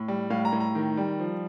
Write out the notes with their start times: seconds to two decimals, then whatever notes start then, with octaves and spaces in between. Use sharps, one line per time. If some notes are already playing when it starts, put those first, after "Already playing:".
Already playing: A2
0.08 G3
0.30 A2 F5
0.45 A#5
0.53 A2
0.60 A#5
0.75 D#3
0.97 G3
1.19 F3